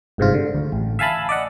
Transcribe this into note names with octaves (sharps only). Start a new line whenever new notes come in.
G1 G#2 C3 F4
D3
D2
A1
E5 F5 G#5 A5 B5
D5 D#5 F#5